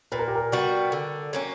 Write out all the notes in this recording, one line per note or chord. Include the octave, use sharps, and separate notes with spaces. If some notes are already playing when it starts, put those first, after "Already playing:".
A#2 B4
A#4
G4
A#4
G3 B3 F#4
D3
F#3 A#3 C#4